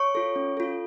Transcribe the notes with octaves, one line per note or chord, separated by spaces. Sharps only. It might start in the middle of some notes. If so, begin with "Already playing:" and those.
Already playing: C#5 C#6
F4 A4
C#4
F4 A4